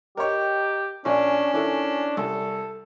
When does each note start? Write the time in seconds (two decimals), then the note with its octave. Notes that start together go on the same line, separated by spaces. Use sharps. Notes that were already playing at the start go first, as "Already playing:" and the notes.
0.17 G4 A#4 C#5 D#5 G5
1.05 A#1 C#4 D4 D5 G#5 C#6
1.53 D#3 D4 E4 A4
2.17 C2 A4